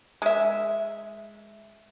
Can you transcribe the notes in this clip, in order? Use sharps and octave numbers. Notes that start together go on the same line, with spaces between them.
G#3 E5